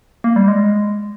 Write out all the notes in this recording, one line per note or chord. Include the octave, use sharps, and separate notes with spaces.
A#3
G3
G#3